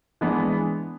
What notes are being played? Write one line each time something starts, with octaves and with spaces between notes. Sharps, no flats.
E3 G#3 B3 D4